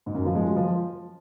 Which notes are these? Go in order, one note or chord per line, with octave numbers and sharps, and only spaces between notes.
G#2
F#2
F3
G#3
F#3
F3